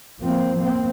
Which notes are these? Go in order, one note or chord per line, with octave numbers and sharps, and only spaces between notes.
F3 A#3 C4
A#3 C4